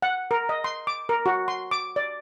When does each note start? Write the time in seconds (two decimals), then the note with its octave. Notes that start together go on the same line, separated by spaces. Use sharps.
0.02 F#5
0.31 A#4
0.49 D#5
0.64 C6
0.87 D6
1.09 A#4
1.26 F#4
1.48 C6
1.71 D6
1.96 D5